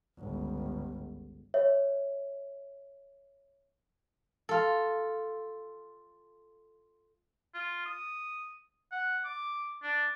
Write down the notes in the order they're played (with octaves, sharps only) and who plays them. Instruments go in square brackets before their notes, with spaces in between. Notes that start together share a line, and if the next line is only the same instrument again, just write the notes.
[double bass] G1 C#2
[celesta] C#5 E5
[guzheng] F4 A4
[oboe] F4
D#6
F#5
D6
D4